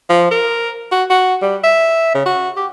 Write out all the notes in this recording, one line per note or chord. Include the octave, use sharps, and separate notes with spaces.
F3
A#4
F#4
F#4
G3
E5
C#3
F#4
G4